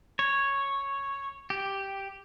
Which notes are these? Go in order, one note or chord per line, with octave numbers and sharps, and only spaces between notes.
C#5
G4